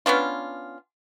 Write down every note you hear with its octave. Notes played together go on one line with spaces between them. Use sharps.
B3 C#4 D4 F4